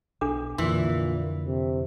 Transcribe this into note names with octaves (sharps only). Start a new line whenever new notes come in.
B1 D4 A4 D6
F2 A#2 D3 E3 C6
C3